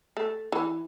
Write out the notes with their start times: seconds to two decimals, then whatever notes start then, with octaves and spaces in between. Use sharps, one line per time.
0.17 A3
0.52 E3